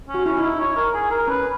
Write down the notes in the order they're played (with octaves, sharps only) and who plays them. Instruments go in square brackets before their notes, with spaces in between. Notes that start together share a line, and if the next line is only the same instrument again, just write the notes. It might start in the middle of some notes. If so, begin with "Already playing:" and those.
[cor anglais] C#4
[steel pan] F#4
[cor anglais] C#4 [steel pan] E4
[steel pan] D#4 [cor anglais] E4
[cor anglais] C#5
A#4
G#4
A#4
[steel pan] C#4 [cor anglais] B4